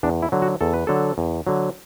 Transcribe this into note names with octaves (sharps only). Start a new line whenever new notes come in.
E2 D4
E4
D3 F#3
F#4
E2 A4
B4
D3 F#3 A4
E2
D3 F#3